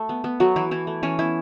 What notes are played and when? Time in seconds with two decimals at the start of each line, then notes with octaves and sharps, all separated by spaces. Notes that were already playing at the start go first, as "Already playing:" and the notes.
Already playing: A3 A4
0.09 B3
0.24 B3
0.40 F#3 A3 F#4
0.56 E3 E4
0.71 E3 E4
0.87 A3
1.03 E3 C#4
1.19 B3 E4